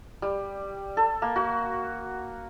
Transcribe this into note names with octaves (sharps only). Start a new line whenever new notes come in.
G3
A4
A#3
F#4